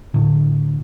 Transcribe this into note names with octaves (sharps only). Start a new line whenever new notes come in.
A2 D3